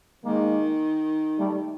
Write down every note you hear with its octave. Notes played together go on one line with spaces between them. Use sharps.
D#3 G#3 A#3
G3 A3